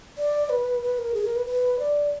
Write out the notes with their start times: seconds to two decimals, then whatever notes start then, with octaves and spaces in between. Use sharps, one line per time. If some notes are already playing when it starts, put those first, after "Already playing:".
0.18 D5
0.49 B4
0.82 B4
0.98 A#4
1.14 G#4
1.25 A#4
1.36 B4
1.46 B4
1.79 D5